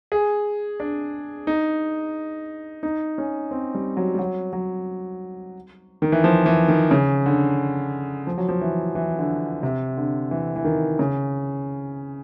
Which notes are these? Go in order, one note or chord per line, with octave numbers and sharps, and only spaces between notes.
G#4
D4
D#4
D#4
C#4
C4
G3
F#3
G3
F#3
F#3
D#3
E3
F3
E3
D#3
C#3
D3
F3
F#3
F3
E3
E3
D3
C3
D3
E3
E3
D#3
C#3